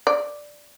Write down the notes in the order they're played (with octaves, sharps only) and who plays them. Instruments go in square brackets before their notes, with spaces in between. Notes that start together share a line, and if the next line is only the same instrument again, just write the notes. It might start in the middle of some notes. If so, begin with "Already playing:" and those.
[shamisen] D5